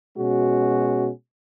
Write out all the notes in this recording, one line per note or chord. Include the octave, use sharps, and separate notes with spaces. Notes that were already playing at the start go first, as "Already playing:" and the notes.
B2 G#3 C#4 F#4